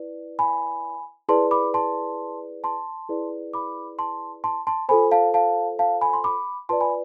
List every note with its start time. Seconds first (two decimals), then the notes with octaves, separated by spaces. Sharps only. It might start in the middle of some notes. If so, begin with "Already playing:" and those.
Already playing: E4 B4 D5
0.39 G#5 B5
1.29 E4 G#4 B4 D5 A5 C6
1.51 B5 D6
1.74 A5 C6
2.64 A5 C6
3.09 E4 G#4 B4 D5
3.54 B5 D6
3.99 A5 C6
4.44 A5 C6
4.67 A5 C6
4.89 F4 A4 C5 G#5 B5
5.11 F5 A5
5.34 F5 A5
5.79 F5 A5
6.01 G#5 B5
6.13 C6
6.24 B5 D6
6.69 F4 B4 D5 A5 C6
6.81 G#5 B5